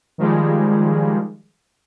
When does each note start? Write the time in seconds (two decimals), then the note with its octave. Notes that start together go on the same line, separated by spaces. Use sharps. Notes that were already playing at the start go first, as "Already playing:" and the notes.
0.18 D#3 F3 G3 G#3